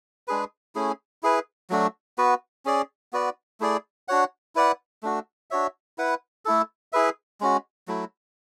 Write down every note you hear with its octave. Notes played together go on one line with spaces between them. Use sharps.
G#3 D4 G#4 B4
A3 C#4 E4 G#4
E4 G#4 B4
F#3 A3 D4 F#4
B3 F#4 B4
C#4 G#4 D5
B3 F#4 B4 D5
A3 E4 G#4 D5
D4 F#4 C#5 F#5
E4 B4 D5 F#5
A3 D4 F#4
D4 F#4 C#5 E5
E4 B4 F#5
A3 E4 A4
E4 G#4 B4 E5
G#3 C#4 F#4
F#3 A3 E4